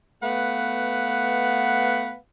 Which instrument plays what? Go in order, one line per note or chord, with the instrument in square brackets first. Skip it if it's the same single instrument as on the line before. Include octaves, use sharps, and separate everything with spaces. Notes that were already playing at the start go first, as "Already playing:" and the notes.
[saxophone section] A3 B3 B4 F5 F#5